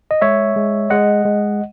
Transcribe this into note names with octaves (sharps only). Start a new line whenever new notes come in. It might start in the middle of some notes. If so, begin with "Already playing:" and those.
D#5
G#3 C#5 E5
G#3
G#3 D#5 F#5
G#3